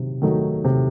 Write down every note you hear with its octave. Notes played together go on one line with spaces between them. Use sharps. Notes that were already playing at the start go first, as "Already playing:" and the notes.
Already playing: C3 D#3 F#3
D#3 F#3 A3 D#4
C3